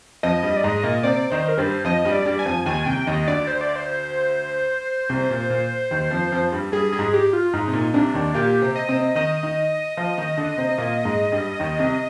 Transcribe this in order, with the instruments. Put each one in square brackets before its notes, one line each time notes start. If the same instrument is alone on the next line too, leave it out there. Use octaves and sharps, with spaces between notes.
[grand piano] F2 F3 [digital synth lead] D#5
[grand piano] G2 G3
[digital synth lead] D5
[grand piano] G#2 G#3 [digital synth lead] D#5
[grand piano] A#2 A#3
[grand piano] C3 C4 [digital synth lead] D5
[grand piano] D#3 D#4 [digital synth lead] C5
[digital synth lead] A#4
[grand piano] G2 G3 [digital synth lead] C5
[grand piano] F2 F3 [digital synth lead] D#5
[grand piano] G2 G3
[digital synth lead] D5
[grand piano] G2 G3
[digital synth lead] G#5
[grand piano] F2 F3
[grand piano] D#2 D#3 [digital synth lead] G#5
[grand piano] C2 C3 [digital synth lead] G5
[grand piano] D#2 D#3 [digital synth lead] D#5
[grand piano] D2 D3 [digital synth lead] D5
[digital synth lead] C5
D5
C5
[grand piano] C2 C3
A#2
A#2
D#2 D#3
F2 F3
F2 F3
G2 G3
[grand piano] G2 G3 [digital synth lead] G#4
[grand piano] G3 [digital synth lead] G#4
[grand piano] G#2 G#3
[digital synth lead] G4
F4
[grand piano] G#2 [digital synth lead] D#4
[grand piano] C3
A#2
[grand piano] C2 C3 [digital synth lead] D4
[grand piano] D#2 D#3
[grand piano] A#2 A#3 [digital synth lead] G4
[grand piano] C3 C4
[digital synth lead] D#5
[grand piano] C3 C4
[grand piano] D#3 D#4 [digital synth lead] D#5
[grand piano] D#3 D#4
F3 F4
D#3 D#4
D3 D4
C3 C4
A#2 A#3
G#2 G#3
G2 G3
D#2 D#3
C2 C3